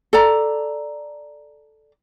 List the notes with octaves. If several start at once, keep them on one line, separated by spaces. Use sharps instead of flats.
A4 D5 A#5